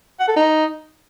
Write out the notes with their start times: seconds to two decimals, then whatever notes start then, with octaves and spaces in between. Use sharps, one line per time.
0.20 F#5
0.28 A4
0.36 D#4